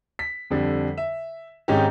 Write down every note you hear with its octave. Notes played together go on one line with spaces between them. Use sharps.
B6
F2 D3 G3
E5
G#2 D#3 C4 C#4 D#4 G4